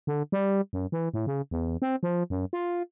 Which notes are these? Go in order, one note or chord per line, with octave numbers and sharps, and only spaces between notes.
D3
G3
F#2
E3
A2
C#3
E2
C4
F3
F#2
F4